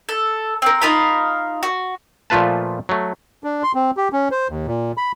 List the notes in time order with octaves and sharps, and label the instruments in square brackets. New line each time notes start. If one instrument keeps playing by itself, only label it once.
[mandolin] A4
C4 A#4
D#4 F4 A#4 B5
F#4
[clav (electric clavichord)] A#2 F3 A3 F4 B4 A5
F#3 A3
[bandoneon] D4
C6
C4
G4
C#4
C5
D#2
A#2
B5